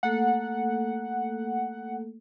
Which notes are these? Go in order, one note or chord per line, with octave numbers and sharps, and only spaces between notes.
A3 A#3 A4 F#5